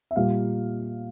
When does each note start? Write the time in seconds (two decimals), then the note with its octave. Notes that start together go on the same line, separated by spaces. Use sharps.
0.11 E5
0.16 A#2 G3 A#3 F5